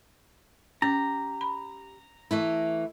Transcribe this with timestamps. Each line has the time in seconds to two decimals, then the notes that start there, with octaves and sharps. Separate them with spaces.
0.82 C#4 G4 A#5
1.41 B5
2.31 E3 A3 E4